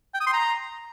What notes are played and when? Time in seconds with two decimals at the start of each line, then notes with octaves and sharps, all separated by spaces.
0.14 G5
0.20 D#6
0.27 C6
0.33 A#5